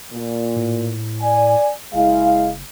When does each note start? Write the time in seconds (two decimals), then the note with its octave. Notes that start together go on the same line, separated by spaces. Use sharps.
0.11 A#2
0.56 A2
1.22 D5 G#5
1.94 F#1 G#3 E4 F5